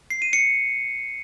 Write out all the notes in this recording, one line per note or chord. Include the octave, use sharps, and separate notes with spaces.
C7
D#7
C#7